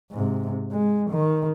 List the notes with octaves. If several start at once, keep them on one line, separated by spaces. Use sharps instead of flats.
G#2 C3
G#3
D#3